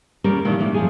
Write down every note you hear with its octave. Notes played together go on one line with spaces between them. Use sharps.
D#2 G3 C#4 A#4
A#2 D#3 E3 D4
A2 E3 A#3
F#2 F3 G#4